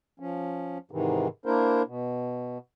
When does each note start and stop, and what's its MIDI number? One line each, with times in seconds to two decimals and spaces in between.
0.20 0.78 53
0.20 0.78 61
0.91 1.28 44
0.91 1.28 48
0.91 1.28 51
0.91 1.28 52
1.46 1.82 58
1.46 1.82 62
1.46 1.82 64
1.46 1.82 70
1.46 1.82 72
1.87 2.58 47